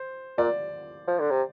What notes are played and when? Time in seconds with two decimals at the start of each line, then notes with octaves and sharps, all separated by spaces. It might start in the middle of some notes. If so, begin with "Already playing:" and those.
Already playing: C5
0.38 A#2 D5
1.08 F3
1.19 D3
1.31 C3